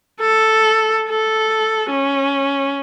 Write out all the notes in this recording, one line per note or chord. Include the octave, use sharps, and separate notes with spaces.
A4
A4
C#4